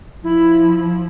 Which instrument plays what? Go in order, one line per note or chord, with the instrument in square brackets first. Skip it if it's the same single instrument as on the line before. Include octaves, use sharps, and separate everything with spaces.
[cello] F3 [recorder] E4